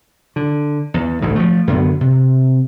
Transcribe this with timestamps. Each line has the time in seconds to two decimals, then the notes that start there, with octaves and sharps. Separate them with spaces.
0.36 D3
0.94 E2
1.22 A1 D2 G#2
1.35 F3 F#3 A3
1.67 F#2 D3 B3
2.01 C3